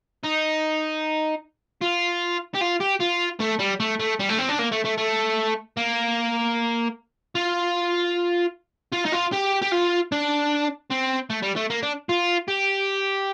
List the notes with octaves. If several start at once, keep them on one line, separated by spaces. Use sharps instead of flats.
D#4
F4
G4
F4
G4
F4
A3
G3
A3
A3
G3
A3
C4
D4
A#3
A3
A3
A3
A#3
F4
F4
D#4
F4
G4
G4
F4
D4
C4
A3
G3
A3
A#3
D4
F4
G4